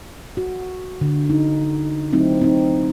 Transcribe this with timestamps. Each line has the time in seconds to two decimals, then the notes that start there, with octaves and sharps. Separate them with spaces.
0.37 F#4
1.01 D3
1.30 D#4
2.12 F#3 A3 C4 D#4 E4
2.41 C4 D#4